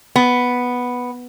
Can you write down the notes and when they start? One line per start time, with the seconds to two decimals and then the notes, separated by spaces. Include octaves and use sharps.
0.16 B3